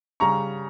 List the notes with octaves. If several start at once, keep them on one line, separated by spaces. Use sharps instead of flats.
C#3 G3 A#5 C#6